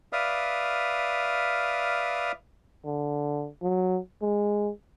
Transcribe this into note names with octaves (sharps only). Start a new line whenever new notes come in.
B4 D5 E5 F5 D#6 F6
D3
F#3
G#3